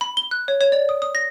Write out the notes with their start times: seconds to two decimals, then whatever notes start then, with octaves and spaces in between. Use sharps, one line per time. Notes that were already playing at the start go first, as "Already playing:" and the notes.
0.01 B5
0.17 G7
0.31 F#6
0.48 C#5
0.61 C#5
0.72 D5
0.89 D#6
1.02 D#6
1.15 A#6